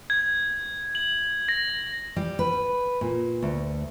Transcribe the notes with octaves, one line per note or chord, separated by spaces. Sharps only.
G#6
F#7
A#6
G3
B4
A#2
D2